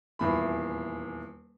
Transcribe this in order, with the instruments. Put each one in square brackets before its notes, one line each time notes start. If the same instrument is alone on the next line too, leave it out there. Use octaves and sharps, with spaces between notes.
[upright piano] D#1 E2 B5